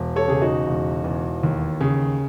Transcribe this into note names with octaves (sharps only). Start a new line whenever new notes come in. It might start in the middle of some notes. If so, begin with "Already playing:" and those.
Already playing: E1
A4 C#5
C#3 G#4
D#4 F#4
E1
E2
D#2
C#3